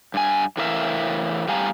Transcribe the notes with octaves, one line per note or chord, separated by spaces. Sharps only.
G2 G#5
A2 E3 A#4 D5 E5 F5
A2 G3 F5 G#5 A#5